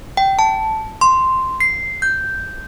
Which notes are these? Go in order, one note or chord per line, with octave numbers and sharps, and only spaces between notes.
G5
A5
C6
C7
G6